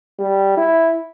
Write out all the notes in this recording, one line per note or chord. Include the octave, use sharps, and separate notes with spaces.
G3
E4